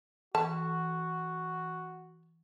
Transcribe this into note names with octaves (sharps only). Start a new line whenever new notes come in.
E3 F#4 A5